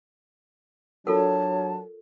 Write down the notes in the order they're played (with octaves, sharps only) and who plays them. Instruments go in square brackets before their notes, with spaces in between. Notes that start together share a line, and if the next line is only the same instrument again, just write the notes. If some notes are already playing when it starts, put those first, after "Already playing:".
[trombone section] F#3 D4 [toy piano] F4 A4 A#4 [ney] C#5 [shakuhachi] A5